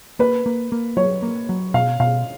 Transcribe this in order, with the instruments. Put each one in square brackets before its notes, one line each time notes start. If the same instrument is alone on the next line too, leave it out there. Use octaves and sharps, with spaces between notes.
[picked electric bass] A#3 [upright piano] B4
[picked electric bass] A#3
A#3
[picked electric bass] F#3 [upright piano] C#5
[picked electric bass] A#3
F#3
[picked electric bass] B2 [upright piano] F5
[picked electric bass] B2 [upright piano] F5